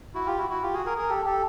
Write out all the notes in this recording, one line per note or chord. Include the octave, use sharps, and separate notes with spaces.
E4 F#4
F4 G4
E4 F#4
E4 F#4
F4 G4
F#4 G#4
G#4 A#4
G#4 A#4
G4 A4
G4 A4